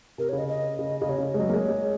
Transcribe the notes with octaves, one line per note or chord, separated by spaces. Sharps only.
C3 A#4
C#3 C#5
D#5
D#5
C#3
C#3 D#5
C3 C#5
C#3
G#3
F#3 D#5
A#3
G#3 C#5
G#3